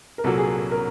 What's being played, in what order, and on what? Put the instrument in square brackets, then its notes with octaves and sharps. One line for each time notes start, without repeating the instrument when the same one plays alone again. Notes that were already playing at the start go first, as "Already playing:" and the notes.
[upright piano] A#4
[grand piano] C2 A#2 F#3 A#3 [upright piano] A4
[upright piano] G#4
A4
A#4